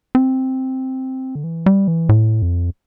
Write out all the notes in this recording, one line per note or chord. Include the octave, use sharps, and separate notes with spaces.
C4
D3
E3
G3
E3
A2
F2